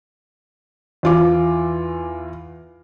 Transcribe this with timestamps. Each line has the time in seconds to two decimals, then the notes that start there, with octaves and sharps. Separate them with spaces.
1.03 E2 F4 D6